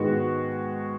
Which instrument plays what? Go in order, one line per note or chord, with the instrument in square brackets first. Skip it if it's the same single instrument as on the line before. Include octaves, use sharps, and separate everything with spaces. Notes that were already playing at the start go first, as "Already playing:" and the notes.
Already playing: [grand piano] G#2 D#3 G#3 B3 F#4